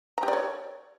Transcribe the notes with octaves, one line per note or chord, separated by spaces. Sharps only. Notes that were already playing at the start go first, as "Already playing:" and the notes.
A#5
G4
D5
C#5